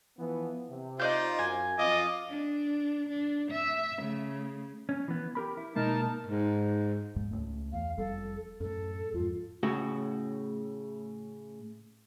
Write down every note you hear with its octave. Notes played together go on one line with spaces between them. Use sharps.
E3 F3 B3
C3
D#4 F4 C5 D5 G6
F#2 G#5
F2 F4 D#5 D6
D4
D4
E5
C#3 A3
C#4
E3 B3
G4 A#4 B5
E4
B2 G#3 A#3 D#4 A#4 A5
G#2
D#2 G#2 G#3
C#2 A3
E2 F5
F1 G3 A4
F#2 A2 A4
F2 G#2 F4
A2 C#3 F#4